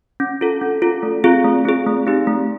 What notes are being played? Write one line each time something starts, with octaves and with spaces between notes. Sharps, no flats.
C#4
F4 A4
C#4
F4 A4
A3
C4 F4 G#4
A3
C4 F4 G#4
A3
C4 D#4 G4
A3